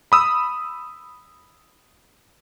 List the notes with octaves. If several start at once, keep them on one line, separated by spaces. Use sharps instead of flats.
B5 D#6 E6